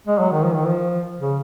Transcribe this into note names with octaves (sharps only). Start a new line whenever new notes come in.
G#3
F#3
D#3
F3
D#3
F3
C#3